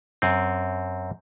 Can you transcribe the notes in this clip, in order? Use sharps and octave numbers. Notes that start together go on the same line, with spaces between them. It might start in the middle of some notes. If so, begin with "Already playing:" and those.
F#2 C4